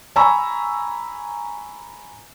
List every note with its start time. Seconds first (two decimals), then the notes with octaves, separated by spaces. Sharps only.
0.16 G#5 A#5 B5 C#6 E6